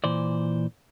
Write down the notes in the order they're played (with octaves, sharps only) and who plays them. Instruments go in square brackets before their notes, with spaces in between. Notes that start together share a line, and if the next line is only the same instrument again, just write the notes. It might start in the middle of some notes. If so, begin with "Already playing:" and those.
[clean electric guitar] A#2 E3 C5 D5